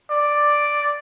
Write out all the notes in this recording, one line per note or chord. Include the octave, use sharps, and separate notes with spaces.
D5